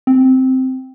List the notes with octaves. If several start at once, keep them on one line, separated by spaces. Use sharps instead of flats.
C4